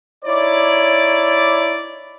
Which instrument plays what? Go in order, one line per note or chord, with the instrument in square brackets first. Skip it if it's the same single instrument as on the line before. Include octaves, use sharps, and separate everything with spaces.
[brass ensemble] D#4 E4 C#5 D5